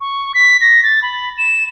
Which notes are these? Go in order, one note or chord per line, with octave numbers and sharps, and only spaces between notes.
C#6
B6
A#6
A6
B5
E7